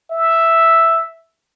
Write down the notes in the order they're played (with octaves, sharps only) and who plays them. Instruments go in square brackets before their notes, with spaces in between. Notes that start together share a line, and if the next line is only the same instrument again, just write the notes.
[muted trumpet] E5